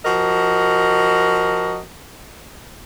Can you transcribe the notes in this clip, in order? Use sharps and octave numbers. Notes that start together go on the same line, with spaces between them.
F3 F#4 A#4 D#5